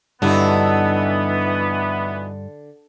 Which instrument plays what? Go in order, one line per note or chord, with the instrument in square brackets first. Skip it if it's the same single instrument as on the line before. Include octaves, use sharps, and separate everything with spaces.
[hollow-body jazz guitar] G2 [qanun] D3 [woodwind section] E3 B3 [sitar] F#3 D#4 E4